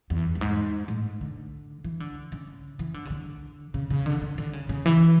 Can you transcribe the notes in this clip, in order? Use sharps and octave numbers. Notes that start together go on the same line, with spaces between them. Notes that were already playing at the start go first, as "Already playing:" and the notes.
E2
F#2
G#2
A2
D3
E3
D3
C#3
E3
D3
C#3
D3
C#3
C#3
D3
D3
D3
C#3
C#3
E3